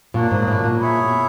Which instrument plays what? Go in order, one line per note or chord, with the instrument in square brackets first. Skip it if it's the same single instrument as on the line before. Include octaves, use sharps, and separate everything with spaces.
[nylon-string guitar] A#2 [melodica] F#3 A#3 D4 F#4
[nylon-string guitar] G#2
A#2
A2
B2
A#2
[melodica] E4 G#4 C#5 E5
[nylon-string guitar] B2